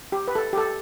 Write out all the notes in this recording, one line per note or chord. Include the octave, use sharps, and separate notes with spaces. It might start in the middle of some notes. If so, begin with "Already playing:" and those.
G4
B4
A4
G4
A4